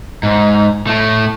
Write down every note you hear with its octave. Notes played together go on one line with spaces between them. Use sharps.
G#2
A2 A3